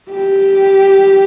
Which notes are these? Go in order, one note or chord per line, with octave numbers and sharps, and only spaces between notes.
G4